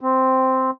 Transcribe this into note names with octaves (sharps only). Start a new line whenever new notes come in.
C4